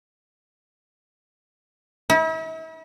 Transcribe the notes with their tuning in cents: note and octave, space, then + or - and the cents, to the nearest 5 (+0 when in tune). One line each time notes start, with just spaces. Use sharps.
E4 -40